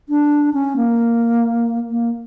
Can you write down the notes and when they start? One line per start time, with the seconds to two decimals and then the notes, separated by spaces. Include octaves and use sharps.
0.09 D4
0.53 C#4
0.76 A#3
1.90 A#3